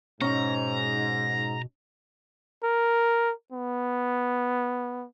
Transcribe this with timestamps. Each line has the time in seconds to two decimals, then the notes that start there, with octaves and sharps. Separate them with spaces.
0.21 G#2 B2 C#4 D#4 A#5
2.64 A#4
3.52 B3